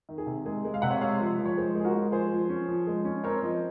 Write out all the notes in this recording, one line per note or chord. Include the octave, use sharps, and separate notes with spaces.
D#3
G#4
C3
G#3 G#4
G#3
F5
C3 F#5
C#5 F5
G#3 C#5 F5
F3
F3
C#5
G#3 G#4 C5
G#3
G#4
F#4 A#4
G#3
F3 G#4 C5
F3
C#4
F3
G#3
C#4
C4 A#4 C#5
F3 C5 D#5